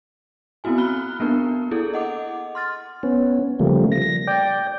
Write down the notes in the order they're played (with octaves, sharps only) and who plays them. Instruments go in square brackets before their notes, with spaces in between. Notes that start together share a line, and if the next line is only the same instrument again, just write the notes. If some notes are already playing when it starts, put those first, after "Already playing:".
[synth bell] B3 C4 E4 F#4 G#5
B5 F6 F#6 G7
A#3 B3 D4 A#4
E4 G#4 A4
D#5 F#5 D6
C6 F6 A6
[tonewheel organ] B3 C#4
C#3 F3 G3 A3 A#3
A#6
D5 G5